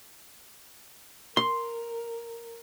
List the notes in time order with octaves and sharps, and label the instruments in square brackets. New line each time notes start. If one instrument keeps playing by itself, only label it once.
[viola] A#4 [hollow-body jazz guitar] C6